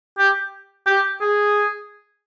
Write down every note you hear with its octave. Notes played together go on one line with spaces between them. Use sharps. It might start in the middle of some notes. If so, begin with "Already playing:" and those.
G4
G4
G#4